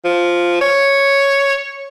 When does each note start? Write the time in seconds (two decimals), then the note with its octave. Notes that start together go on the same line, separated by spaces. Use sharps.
0.05 F3
0.61 C#5